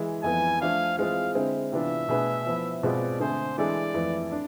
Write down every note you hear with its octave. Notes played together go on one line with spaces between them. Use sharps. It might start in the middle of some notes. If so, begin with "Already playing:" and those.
Already playing: E3 G#3
F2 E3 B3 G#5
F3 A3 D4 F5
E3 G#3 C4 F4 G#4 F5
D3 G#3 C4 E4
C3 E3 B3 D4 F4 E5
B2 A3 D4 G#4 B4
F3 B3 E4
B2 G#3 C4 F4 B4 D5
D3 A3 C4 G#4 C5
E3 G#3 D4 A4 D5
F2 E3 A3 E4 B4
D4